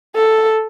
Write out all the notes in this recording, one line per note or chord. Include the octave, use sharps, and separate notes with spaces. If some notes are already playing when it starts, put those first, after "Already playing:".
A4